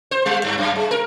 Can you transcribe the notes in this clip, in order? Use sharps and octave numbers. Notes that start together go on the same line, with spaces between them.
C5
G3
G2
F#2
G#3
A#4